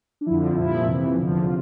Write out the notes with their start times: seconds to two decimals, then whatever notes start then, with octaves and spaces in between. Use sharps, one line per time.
0.21 D4
0.26 F2 D3 F3 E4
0.56 C2 A#2 F3 E4
0.85 F2 C3 E3
1.15 E2 D3 F3
1.45 C3 F4